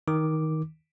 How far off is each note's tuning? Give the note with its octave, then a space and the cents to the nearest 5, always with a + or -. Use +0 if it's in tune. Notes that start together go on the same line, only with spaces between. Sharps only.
D#3 +15 D6 +0